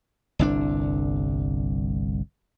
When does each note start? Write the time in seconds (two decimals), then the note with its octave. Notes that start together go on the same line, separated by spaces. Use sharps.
0.39 G1 C2 D4